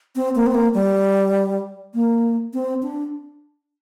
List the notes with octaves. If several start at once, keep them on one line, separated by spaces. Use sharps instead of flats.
C4
A#3
C4
A#3
G3
A#3
C4
D4